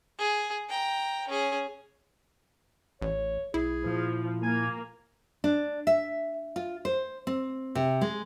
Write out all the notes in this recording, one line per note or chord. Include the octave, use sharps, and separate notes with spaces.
G#4
G5 A#5
C#4 G#4
A1 C#5
B1 E4 G#4
A#2 F3
A#3 G#5
D4
E5
F4
C5
C4
C3
G#3